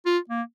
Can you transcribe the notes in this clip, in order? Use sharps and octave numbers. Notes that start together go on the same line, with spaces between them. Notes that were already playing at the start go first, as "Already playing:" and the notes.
F4
A#3